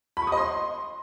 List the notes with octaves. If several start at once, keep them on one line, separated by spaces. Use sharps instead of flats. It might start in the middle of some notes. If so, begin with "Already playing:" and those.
B5
C#6
D#6
D#5
C6